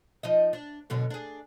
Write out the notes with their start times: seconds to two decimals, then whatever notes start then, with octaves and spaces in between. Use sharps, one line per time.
0.23 F3 D#4 D#5
0.53 D4
0.90 F#2 B2 D3
1.10 D4 G#4